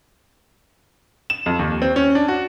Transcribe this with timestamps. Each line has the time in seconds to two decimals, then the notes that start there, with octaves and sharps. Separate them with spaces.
1.30 E7
1.46 F2
1.59 D#2
1.82 C4
1.96 C#4
2.15 D4
2.28 F#4